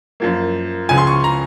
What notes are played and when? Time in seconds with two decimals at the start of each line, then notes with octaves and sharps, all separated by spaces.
0.20 F#2 F3 A#3
0.89 C#2 C#3 F3 G#5
0.98 C6
1.07 C#6
1.24 A#5